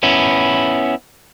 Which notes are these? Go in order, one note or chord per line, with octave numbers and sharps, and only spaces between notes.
B3 C#4 E4